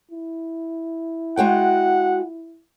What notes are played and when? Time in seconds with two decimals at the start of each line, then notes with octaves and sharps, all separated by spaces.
0.11 E4
1.37 G#3 F#4 F#5 G5